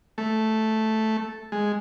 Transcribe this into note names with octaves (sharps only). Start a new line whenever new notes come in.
A3
G#3